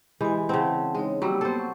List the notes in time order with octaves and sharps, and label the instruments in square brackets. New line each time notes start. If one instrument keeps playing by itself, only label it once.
[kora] E3 G#3 [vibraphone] G4 G#5
[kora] C#3 C4 [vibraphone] F#5 A5
[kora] G#3 [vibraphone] D#4 C#5
[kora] F#3 G3 [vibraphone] A#3 E6
[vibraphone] A#3 B3 [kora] A4 C5
[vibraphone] F#5 C#6